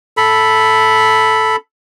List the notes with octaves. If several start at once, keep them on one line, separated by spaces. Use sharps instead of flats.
A4 B5